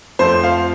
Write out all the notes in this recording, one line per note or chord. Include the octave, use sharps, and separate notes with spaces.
F2 F3 A3 C4 C5
F5